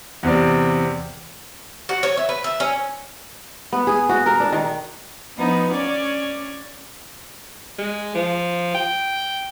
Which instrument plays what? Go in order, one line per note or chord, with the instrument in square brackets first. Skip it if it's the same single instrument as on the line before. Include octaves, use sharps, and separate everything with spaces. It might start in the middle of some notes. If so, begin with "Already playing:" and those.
[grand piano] E2 C3 D5
[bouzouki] F#4
C#5
E5
B4
E5
C#4
[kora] B3
G#4
F#4
A#4
D4
D#3
[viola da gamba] F3 B3 D#4
C#4 C#5 D5
[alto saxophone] G#3
F3
G5